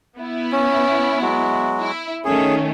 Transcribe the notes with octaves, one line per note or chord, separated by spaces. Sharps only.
B3 E4
C#4
F#3 G#3 F#4
E4
D#3 A3 C#4 G#4